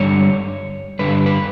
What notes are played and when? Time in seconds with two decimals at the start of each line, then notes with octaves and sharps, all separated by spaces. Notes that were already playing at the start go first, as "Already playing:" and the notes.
Already playing: G2 D3 G3 C#5
0.99 G2 D3 G3 B4
1.26 B4